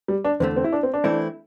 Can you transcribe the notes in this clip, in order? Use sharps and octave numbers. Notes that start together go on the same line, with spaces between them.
G3
D4
E2 D3 A3 C4
C4
E4
D4
C4
D4
E3 A3 C4 E4